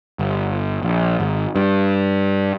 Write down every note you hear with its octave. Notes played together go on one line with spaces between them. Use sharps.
G1
A#1
G#1
G2